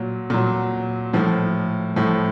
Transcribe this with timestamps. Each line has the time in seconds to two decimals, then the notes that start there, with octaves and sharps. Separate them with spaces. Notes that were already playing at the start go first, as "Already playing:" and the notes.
Already playing: A#2 F#3
0.30 A#2 F#3
1.13 A2 F3
1.96 A2 F3